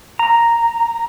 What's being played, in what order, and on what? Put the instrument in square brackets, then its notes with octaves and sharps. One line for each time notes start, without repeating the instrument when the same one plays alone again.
[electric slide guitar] A#5